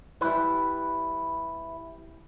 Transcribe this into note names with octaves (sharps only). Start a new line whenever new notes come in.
E3 G3 E4 B4